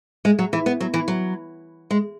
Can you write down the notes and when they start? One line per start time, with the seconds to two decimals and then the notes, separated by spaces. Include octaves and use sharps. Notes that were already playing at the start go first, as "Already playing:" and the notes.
0.25 G#3
0.39 F#3
0.53 E3
0.66 B3
0.80 F#3
0.94 E3
1.08 F#3
1.91 G#3